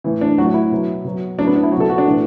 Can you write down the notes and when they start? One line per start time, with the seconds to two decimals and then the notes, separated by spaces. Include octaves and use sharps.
0.04 A2 E3
0.21 D4
0.38 A2 F#3 F#4
0.54 E4
0.72 B2 F#3
1.05 B2 F#3
1.38 A2 F#3 D4
1.47 B3
1.56 D4
1.63 E4
1.72 F#3 F#4
1.77 B2 A4
1.90 F#4
1.98 D4
2.06 A2 E3